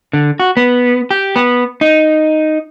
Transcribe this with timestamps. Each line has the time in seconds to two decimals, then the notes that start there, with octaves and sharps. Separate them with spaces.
0.13 D3
0.40 F#4
0.57 B3
1.11 G4
1.36 B3
1.81 D#4